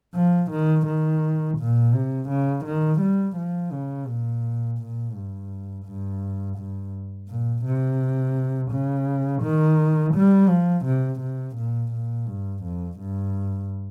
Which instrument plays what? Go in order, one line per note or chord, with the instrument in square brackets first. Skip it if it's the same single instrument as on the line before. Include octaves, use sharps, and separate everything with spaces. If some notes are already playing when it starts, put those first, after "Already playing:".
[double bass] F3
D#3
D#3
A#2
C3
C#3
D#3
G3
F3
C#3
A#2
A#2
G2
G2
G2
A#2
C3
C#3
D#3
G3
F3
C3
C3
A#2
A#2
G2
F2
G2